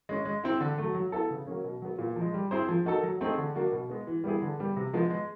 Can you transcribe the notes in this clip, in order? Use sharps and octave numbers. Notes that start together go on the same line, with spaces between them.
G#3 C#4
G#3
C4 E4
D3
F#3 A3
F#3
B3 E4 A4
C#3
F#3 A#3 C#4
B2
F#3 B3
A#2
F3
G#3
G3
C4 E4 G#4 C5
F3
A#3 D#4 F#4 A4
F#3
A3 C4 D#4 G#4
D3
F#3 A#3 D4 F#4
B2
G#3 B3
E3
G3 B3 E4 G#4
D3
G3 B3
C3
F3 G#3 B3
G#3